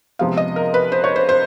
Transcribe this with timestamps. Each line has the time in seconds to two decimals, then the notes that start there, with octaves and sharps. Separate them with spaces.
0.19 C3 F3 G#3 B3 F5
0.37 D#5
0.56 A#4
0.74 B4
0.92 C5
1.04 C#5
1.16 C5
1.29 C5